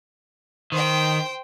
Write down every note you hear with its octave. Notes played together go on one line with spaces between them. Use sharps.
D#3 C5 G5